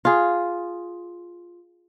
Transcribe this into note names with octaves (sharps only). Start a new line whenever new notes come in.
F4 G#4